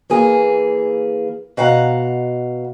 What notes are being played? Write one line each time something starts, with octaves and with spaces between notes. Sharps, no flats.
E3 A#3 G#4
B2 F5 F#5 A#5